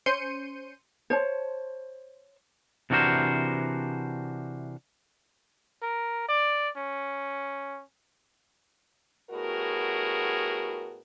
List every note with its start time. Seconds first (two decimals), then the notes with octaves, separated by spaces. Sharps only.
0.06 C#4 C5 C6 G6 C#7 D#7
1.10 C5 C#5 A5
2.90 C3 E3 D4 F#4 A#4 C5
5.82 A#4
6.29 D5
6.76 C#4
9.31 A2 G3 B3 F#4 G#4 A#4